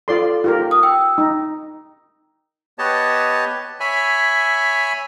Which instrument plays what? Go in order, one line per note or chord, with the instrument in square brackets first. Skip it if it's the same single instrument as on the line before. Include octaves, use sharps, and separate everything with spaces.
[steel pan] F4 D5 C6 [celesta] A4
[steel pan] F4 G4 A#4
[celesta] D#6
G5 E6
[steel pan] D#4
[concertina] B3 G4 C#5 D#5 A5
C#5 E5 G#5 B5